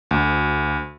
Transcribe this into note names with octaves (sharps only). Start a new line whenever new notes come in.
D2